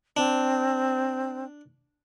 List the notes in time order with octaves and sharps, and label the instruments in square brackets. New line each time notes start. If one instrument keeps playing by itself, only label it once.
[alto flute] C4 [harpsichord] D4